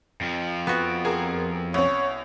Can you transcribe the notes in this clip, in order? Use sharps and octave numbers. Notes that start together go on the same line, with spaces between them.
F2 F3
B3 F#4
G#4 A#4
C2 C#4 C#5